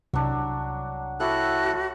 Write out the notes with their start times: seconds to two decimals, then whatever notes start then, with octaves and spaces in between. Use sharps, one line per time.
0.14 C2 F#3 D4
1.20 E4 F#4 G4 A4 C#5 F#6